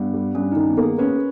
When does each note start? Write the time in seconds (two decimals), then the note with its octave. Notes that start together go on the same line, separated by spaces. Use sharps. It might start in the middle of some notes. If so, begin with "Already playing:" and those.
Already playing: G2 B3
0.14 G3
0.35 G2 C#4
0.52 D#3 D#4
0.68 B3
0.77 A#3
0.83 G#4
0.98 C#4 B4